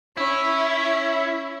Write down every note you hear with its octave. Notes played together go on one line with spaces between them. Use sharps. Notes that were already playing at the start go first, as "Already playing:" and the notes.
C#4 E4